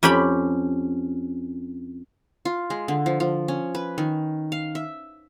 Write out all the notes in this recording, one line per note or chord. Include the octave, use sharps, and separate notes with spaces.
F2 C#4 G4 G5 B5
F4
G#3
D3
F3
F3
C#4
B4
D#3
F5
E5